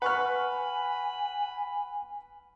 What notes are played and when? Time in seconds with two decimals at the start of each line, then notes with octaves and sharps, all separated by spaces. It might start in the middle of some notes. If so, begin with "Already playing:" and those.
0.02 B4 F#5 G#5 B5 C#6 F6 F#6